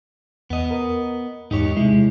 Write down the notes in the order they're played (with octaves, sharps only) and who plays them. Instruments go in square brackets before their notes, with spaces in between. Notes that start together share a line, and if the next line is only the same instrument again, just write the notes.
[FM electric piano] E2 [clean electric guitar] B3 D#5
[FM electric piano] A#4
[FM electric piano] E2 G#2 [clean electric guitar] D#4 G4 C#5
[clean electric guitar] C3 G#3 [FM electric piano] E4